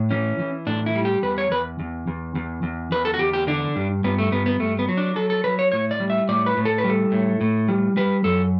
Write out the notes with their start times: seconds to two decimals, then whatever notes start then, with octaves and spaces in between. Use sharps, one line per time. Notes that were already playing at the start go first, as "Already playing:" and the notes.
Already playing: A2
0.11 E3 C#4
0.39 E3
0.67 A2 D4
0.86 E4
0.95 G3
1.05 G4
1.23 E2 B4
1.38 C#5
1.51 E2 B4
1.80 E2
2.08 E2
2.35 E2
2.63 E2
2.92 E2 B4
3.05 A4
3.14 F#4
3.19 E2 G4
3.33 G4
3.47 D3 D4
3.76 G2
4.04 G2 B3
4.18 A3
4.32 G2 B3
4.46 B3
4.60 G2 A3
4.79 B3
4.89 F#3
4.97 D4
5.16 F#3 A4
5.30 A4
5.44 F#3 B4
5.59 C#5
5.72 A2 C#5
5.91 D5
6.00 G3
6.10 E5
6.29 A2 D5
6.46 B4
6.57 A2
6.65 A4
6.78 B4
6.84 G3
6.89 A4
7.12 A2
7.41 A2
7.69 G3
7.97 G3 B4
8.24 F#2 A4